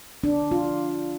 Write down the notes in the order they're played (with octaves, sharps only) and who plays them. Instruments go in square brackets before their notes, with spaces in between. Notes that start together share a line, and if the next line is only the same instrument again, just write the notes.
[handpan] D4
F4